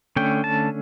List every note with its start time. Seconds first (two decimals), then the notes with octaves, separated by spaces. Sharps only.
0.16 D3 A3 C#4 G5
0.44 A5